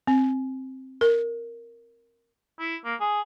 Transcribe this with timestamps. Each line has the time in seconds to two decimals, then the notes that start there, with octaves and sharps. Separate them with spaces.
0.07 C4
1.01 A#4
2.60 E4
2.85 A#3
3.00 G#4